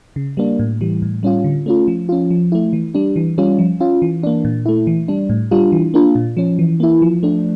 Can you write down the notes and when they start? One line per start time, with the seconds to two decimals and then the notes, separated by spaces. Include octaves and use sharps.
0.16 C#3
0.37 G3 A#3 D4
0.59 A2
0.81 E3 G3
1.02 A2
1.23 G3 C#4 F4
1.44 D3
1.66 A3 C#4 F4
1.88 F3
2.09 C#4 F4
2.31 F3
2.52 A3 E4
2.73 E3
2.94 G3 D4
3.16 E3
3.38 G3 C#4 F4
3.59 F3
3.80 C#4 F4
4.02 E3
4.23 A#3 D4
4.45 A#2
4.66 A3 E4
4.87 E3
5.08 G3 D4
5.29 A2
5.51 G3 D4 F4
5.72 E3
5.94 A#3 D4 F4
6.15 A#2
6.37 F3 C#4
6.59 E3
6.80 A#3 E4
7.02 F3
7.23 A3 D4